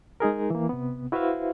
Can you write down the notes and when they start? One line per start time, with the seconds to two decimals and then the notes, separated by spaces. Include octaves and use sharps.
0.20 G#3 D#4 G#4 A#4
0.50 E3 A#3
0.69 C3 B3
1.12 E4 F#4 B4 C5 E5 F5